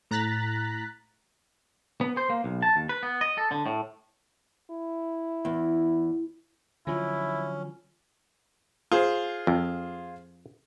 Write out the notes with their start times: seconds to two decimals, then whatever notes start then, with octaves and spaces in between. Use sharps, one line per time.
0.11 A2 A#5 F#6 A6 B6
2.01 B3
2.17 C5
2.30 A#3
2.44 B1
2.62 A5
2.76 D#2
2.89 B4
3.03 B3
3.21 D#5
3.38 A4
3.51 D3
3.66 A2
4.70 E4
5.45 E2
6.87 D3 F3 F#3 C#4 E4 F4
8.92 F4 G#4 C5
9.47 F2